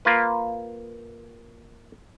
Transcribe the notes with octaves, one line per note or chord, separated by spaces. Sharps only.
A#3 F4 B4